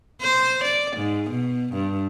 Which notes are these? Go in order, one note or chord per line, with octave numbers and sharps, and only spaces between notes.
C5
D5
G#2
B2
G2